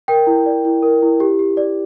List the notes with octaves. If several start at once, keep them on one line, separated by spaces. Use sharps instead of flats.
A#4 G5
E4
D5
E4
A#4
E4
G4
G4
D5